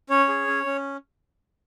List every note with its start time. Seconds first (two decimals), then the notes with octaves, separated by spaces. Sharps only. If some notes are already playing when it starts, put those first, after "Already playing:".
0.10 C#4 C#5
0.28 G#4
0.47 C#4
0.66 C#4